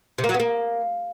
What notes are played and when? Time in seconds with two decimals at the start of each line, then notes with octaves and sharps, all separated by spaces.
0.18 C3
0.24 A#3
0.29 F#3
0.34 B3
0.40 A#3